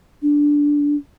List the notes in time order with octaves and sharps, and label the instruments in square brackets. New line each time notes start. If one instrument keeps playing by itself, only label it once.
[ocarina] D4